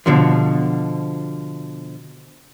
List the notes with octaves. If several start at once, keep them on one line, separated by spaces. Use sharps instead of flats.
B2 D3 F3